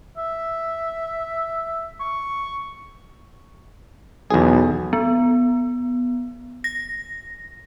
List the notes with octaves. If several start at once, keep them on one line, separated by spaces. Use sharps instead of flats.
E5
C#6
B1 E2 G#4
B3
A#6